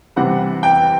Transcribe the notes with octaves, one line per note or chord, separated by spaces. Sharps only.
C3 E3 G3 C4 F#5
G5